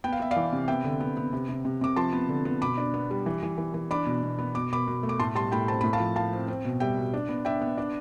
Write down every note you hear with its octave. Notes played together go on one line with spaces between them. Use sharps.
B3 G5
F5
B3 E5
D5 F5
E3
C3
B3 E5 G5
D3
B3
B3
C3
C3
C3
C3 D6
F3 A5 C6
B3
D3
B3
B2 B5 D6
D4
B3
G3
E3
E3
E3
E3
D4 B5 D6
B2
B2
B3
B2 D6
B2 B5 D6
B2
A3
D6
A2 A5 C6
G3 A5 C6
A2 G5 B5
C4 A5
A2 B5
F5 A5
F3
F3 F5 A5
C4
C4
B2
G3 E5 G5
B2
D4
B3
D4 E5 G5
B3
D4